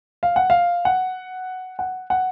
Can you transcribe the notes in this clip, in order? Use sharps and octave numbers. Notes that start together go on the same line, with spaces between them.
F5
F#5
F5
F#5
F#5
F#5